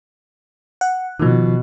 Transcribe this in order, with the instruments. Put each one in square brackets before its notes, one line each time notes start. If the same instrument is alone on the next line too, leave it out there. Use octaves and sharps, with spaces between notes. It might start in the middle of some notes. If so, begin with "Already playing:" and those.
[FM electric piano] F#5
[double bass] B2 [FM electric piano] D#3 F3